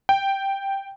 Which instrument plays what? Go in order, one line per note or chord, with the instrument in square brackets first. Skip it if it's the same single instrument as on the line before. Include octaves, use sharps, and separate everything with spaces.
[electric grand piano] G5